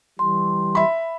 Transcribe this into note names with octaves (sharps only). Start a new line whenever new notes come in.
E3 G3 C6
E5 B5